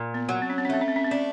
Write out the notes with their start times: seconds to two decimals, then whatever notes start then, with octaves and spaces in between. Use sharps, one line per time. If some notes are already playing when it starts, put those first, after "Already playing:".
Already playing: A#2
0.14 B3
0.29 F#3
0.42 C4
0.50 C#4
0.58 C4
0.65 C#4
0.70 A3 C4
0.81 C#4
0.88 C4
0.96 C#4
1.04 C4
1.11 C#4 D4